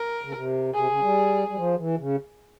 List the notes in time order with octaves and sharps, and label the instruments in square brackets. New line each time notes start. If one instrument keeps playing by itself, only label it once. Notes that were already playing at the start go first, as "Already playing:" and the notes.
Already playing: [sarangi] A#4
[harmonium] C#3
C3
[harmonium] C3 [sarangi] G#4
[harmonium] C#3
G3
G3
F3
E3
C#3